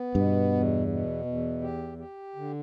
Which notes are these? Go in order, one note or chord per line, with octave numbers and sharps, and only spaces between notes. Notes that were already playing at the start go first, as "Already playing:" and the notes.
Already playing: B3
G2 B2
E2
B2
E2
G4
G4
D3